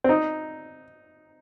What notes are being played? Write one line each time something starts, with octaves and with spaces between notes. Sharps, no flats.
C4
D#4